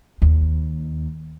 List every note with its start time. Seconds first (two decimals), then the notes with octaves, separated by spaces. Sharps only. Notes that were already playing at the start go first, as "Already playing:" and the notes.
0.22 D#2